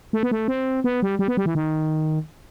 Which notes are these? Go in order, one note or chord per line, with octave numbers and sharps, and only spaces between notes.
A3
B3
A3
C4
B3
G3
G3
B3
G3
E3
D#3